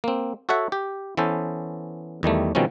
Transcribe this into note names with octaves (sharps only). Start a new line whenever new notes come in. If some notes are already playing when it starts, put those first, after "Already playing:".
A#3 C4
F#4 A4 C#5 E5 F#5
G4
E3 B3 C#4 A4 C5
E2 D#3 G3 A3
B2 D#3 F3 G3 C4 C#4